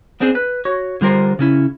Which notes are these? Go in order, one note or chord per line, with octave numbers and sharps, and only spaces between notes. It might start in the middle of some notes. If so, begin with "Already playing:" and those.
B3 C4 D4 G#4 C5
B4
F#4 C#5
D3 G3 F4 A#4 C5
C#3 C#4 E4